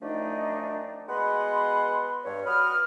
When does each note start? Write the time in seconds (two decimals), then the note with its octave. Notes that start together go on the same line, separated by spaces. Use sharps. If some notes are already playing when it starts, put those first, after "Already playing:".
0.01 F#2 D#3 F3 A3 D4 D#4
1.09 B2 G#3 B3 F#5 B5 C6
2.24 G2 C#5
2.46 F#4 B4 B5 D#6 F6